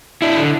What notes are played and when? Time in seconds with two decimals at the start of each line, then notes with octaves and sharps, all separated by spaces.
0.22 D4 E4
0.37 D3